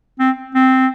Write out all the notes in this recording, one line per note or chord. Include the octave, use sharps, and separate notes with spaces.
C4
C4